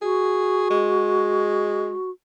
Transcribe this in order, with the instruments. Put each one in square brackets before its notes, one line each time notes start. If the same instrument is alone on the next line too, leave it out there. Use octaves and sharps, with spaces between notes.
[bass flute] F#4 [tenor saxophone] G#4
[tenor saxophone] G#3